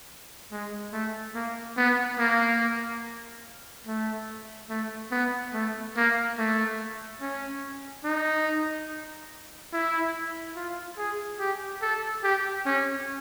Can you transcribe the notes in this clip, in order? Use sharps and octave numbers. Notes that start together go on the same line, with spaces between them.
G#3
A3
A#3
B3
A#3
A3
A3
B3
A3
A#3
A3
C#4
D#4
E4
F4
G#4
G4
A4
G4
C#4